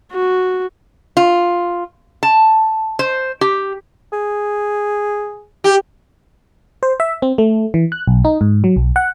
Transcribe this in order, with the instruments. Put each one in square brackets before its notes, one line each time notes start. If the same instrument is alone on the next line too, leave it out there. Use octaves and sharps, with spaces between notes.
[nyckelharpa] F#4
[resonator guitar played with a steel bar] F4
A5
C5
G4
[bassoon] G#4
[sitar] G4
[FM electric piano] C5
E5
C4
A3
E3
F#6
B1
D#4
G#2
F#3
B1
F#5